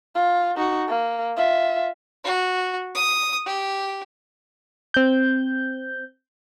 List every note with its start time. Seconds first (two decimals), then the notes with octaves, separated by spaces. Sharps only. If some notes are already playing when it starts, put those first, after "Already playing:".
0.15 F4
0.57 D#4 F#4
0.88 A#3
1.37 F4 E5
2.24 F#4
2.95 D#6
3.46 G4
4.94 C4 G6